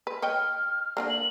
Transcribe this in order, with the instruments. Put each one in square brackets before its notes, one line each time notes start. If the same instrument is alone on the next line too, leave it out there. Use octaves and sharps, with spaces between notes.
[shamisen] B4
[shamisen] C#5 D#5 G5 [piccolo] F6
[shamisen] D3 F#3 A#3
[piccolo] F#7